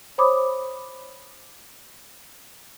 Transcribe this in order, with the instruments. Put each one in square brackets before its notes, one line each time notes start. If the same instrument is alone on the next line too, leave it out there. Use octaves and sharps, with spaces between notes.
[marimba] C5 C#5 B5 D6 D#6